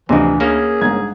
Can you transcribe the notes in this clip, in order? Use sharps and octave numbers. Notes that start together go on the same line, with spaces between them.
D2 C3 E3 F3 D4 D#5
A#3 C#4 G#4
G1 G#2 G#6